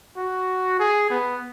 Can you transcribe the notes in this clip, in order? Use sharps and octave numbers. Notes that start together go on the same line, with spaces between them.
F#4
G#4
B3